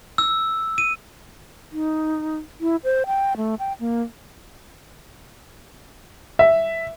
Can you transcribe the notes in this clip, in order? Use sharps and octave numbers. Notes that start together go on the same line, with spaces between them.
E6
D#7
D#4
E4
C5
G5
A3
G5
A#3
E5